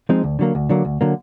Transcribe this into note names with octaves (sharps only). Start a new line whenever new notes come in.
F3 G#3 C4 D#4
D2
D3 F#3 A#3
D2
D3 F#3 A#3
D2
D3 F#3 A#3